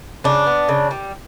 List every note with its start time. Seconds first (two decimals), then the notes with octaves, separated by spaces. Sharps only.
0.24 C#3 D4
0.47 B3
0.69 C#3
0.91 G3